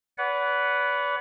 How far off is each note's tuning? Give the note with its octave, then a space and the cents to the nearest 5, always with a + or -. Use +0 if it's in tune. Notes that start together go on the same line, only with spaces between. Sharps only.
B4 +0 D5 -40 F#5 +0